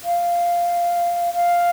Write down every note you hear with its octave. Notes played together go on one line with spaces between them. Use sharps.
F5
F5